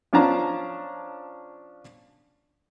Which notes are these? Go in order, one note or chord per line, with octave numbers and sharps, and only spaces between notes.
F3 C#4 D4 F5 A5 A#5